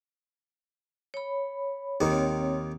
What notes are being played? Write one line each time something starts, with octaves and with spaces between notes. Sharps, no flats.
C#5 B5
D#2 D#3 C4 C#5